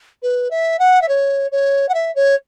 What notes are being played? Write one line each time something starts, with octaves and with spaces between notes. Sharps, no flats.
B4
E5
F#5
E5
C#5
C#5
F#5
E5
C#5